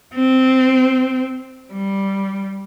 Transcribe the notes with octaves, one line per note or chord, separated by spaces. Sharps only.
C4
G3